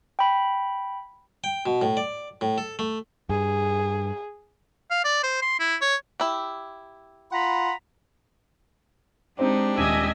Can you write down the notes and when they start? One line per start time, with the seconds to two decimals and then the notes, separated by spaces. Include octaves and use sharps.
0.19 G5 B5
1.44 G5
1.66 B2
1.82 A2
1.97 D5
2.41 A2
2.58 A4
2.79 A3
3.29 G2 G#4
4.91 F5
5.04 D5
5.23 C5
5.42 C6
5.60 E4
5.81 C#5
6.20 E4 G4
7.32 F4 F#5 A#5 B5
9.39 G#3 C4 D4 D#4 G4 C5
9.77 D#1 D#2 D#5 E5 G#5